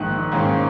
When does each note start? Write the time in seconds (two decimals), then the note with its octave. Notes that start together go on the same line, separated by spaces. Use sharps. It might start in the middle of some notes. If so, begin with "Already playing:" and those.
Already playing: A#1 G#2 D#3 F#6
0.32 G#2 D#3 A#3 C#4